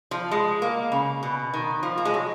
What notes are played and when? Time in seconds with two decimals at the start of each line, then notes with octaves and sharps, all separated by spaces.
0.11 F3
0.31 G#3
0.62 A#3
0.92 C#3
1.23 B2
1.54 D#3
1.83 F3
1.98 A#3
2.05 G#3
2.14 F#3